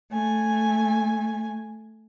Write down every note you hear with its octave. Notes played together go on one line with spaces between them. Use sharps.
A3 G#5